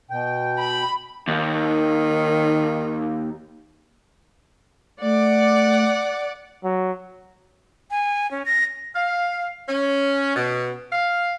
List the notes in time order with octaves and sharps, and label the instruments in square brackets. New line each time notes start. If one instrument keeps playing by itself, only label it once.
[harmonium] B2 G5
[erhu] B5
[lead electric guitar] D#2 [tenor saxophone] D#3
[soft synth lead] A3 [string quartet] D5 F#5 D6
[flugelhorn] F#3
[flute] G#5
C#4
A#6
[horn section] F5
C#4
B2
F5